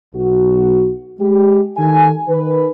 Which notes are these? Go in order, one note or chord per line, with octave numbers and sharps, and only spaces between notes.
B1 F#4
G#3 G4
D#3 A4 G#5
D#3 B4